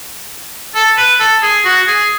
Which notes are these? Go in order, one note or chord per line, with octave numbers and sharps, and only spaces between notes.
A4
B4
A4
G#4
F#4
G#4